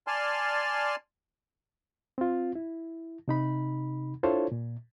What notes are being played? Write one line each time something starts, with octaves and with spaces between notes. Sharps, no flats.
D5 G#5 A5 C6 F6
C4 F4
E4
C3 D#4 B5
D4 E4 F4 A4 C5 C#5
A#2